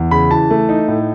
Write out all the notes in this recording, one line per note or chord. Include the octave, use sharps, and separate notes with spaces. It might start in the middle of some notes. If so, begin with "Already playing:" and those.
Already playing: E2
C#3 B5
E3 A5
A3
D#4
A2